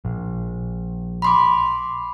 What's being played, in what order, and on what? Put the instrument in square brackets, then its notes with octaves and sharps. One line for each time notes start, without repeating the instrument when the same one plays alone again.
[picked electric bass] A#1
[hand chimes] B5 C6 D6